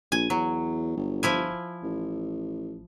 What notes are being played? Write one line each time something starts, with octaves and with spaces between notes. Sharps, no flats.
A#1 G#5
E2 F#3
G1
F3 E4 G#5
A1